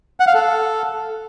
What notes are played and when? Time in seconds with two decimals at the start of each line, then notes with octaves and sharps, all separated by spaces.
0.20 F#5
0.27 F5
0.34 A4